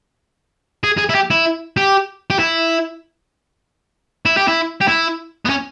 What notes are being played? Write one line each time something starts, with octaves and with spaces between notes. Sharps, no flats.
G#4
G#4
E4
G4
E4
G4
G4
E4
E4
G4
E4
G4
E4
B3
C#4